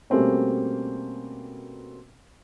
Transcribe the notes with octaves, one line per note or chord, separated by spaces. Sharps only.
B2 G3 A3 A#3 C4 C#4